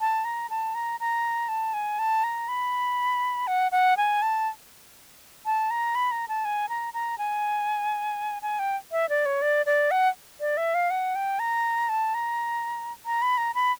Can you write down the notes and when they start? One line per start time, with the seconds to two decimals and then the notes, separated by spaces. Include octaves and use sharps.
0.01 A5
0.25 A#5
0.50 A5
0.75 A#5
1.00 A#5
1.49 A5
1.74 G#5
1.99 A5
2.24 A#5
2.48 B5
3.47 F#5
3.72 F#5
3.97 G#5
4.22 A5
5.46 A5
5.71 A#5
5.95 B5
6.11 A#5
6.28 A5
6.45 G#5
6.69 A#5
6.94 A#5
7.18 G#5
8.42 G#5
8.59 G5
8.92 E5
9.09 D5
9.26 C#5
9.42 D5
9.66 D5
9.91 F#5
10.40 D5
10.57 E5
10.75 F5
10.90 F#5
11.15 G5
11.39 A#5
11.89 A5
12.14 A#5
13.06 A#5
13.22 B5
13.38 A#5
13.55 B5